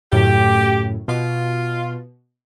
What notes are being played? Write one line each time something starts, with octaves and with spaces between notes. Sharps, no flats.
F#2 A2 C#3 G4
B2 F4